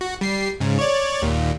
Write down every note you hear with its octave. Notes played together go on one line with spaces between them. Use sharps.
F#4
G3 C7
G#2 C#3
C#5 D5
D#2 A#2